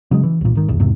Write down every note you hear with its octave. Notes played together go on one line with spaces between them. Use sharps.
C#3 F#3 G#3
E3
C2 A#2
G#1 D#3
F#1 B1 E2
E2 G#2 C3